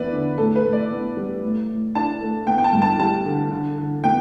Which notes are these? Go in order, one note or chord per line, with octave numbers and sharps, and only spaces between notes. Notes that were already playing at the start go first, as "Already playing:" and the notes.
Already playing: E2 B3 B4 D5 E5
D3
A2 A4
B4
A2
D5
B3
G3
A2
A2
D4 A5
A3
B3 G5
G5
A5
G2
A5
G3 A5
D3
D3
D3
B3 G5